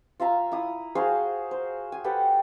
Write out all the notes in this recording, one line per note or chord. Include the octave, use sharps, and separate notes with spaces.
F4 E5 F5 A#5
E4 D#6
F#4 G#4 C5 F5
C5
G#5
G4 A4 B4 F#5